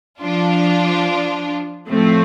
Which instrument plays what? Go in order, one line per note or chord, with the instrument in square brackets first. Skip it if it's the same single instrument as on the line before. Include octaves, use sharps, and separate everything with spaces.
[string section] F3 D4 F4
A2 F3 A3 C4